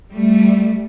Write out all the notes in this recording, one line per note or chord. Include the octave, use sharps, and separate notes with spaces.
G3 A3